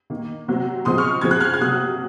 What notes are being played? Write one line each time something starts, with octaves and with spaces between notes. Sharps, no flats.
D#3 A#3
C3 F#3 C4
C#3 F3 G#3 C4 C6 D#6
C#6 F6
C#3 F3 C4 G#6
F#6
F6 G#6
G#6
C3 F#3 A#3 D#6 F#6